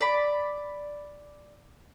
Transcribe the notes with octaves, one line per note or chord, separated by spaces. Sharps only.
D5 B5